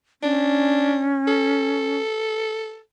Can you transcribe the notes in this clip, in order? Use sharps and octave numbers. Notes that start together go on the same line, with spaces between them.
C#4 D4
A4